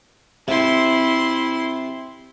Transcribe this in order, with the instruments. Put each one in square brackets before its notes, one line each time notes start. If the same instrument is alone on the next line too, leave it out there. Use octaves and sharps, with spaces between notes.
[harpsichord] C3 [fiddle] E4 C6